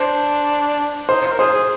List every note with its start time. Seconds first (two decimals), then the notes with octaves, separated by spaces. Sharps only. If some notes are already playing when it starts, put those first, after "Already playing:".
Already playing: D4 C5
1.09 D#4 C5
1.25 F4
1.32 A#4
1.39 G#4 C5
1.54 G#4